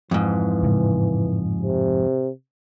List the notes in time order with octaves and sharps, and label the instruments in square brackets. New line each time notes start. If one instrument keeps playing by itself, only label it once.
[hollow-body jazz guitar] F2 G#2 [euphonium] E3
[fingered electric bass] A2 C#3 G#3
[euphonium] C3